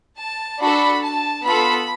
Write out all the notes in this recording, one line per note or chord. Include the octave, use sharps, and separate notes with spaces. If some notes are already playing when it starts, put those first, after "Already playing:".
A5
D4 F#4 A4 B5
A5
B3 F4 A4 B5